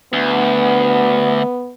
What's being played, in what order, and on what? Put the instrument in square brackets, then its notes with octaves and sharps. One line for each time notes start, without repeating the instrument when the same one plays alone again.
[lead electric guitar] D2 [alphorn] B3